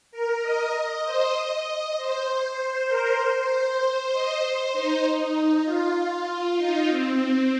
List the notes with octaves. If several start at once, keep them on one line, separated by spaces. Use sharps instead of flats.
A#4
D#5
D#5
C5
D#5
D#5
C5
C5
A#4
C5
C5
D#5
C5
D#4
D#4
D#4
F4
D#4
C4
C4